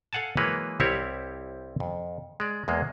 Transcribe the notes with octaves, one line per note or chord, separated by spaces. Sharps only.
A4 F5 F#5 G#5 A5
E3 F#3 G#3 A#3 B4 C#5
C2 G3 C4 E4 G4 C#5
F2
G#3 D5
E2 G#3 A#3